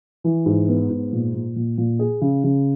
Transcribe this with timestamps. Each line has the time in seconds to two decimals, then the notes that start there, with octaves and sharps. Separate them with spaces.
0.24 E3
0.46 G#2
0.68 B3
0.90 G#2
1.13 A#2
1.34 A#2
1.56 A#2
1.78 A#2
1.99 G#4
2.21 C#3
2.44 C#3